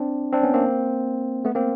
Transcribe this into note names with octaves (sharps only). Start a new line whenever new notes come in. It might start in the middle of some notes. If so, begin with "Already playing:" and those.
Already playing: C4 D4
C4 D4
B3 C#4
A#3 C4
A3 B3
A#3 C4